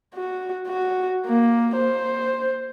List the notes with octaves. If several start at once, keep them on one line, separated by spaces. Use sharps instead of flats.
F#4
F#4
A#3
C5